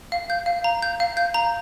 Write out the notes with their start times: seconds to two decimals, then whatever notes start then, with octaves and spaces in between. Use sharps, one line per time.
0.12 F5
0.30 G6
0.46 F5
0.64 A#5
0.82 G6
1.00 F5
1.17 G6
1.34 A#5